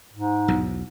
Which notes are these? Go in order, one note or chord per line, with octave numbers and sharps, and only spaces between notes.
G#2
B1 E2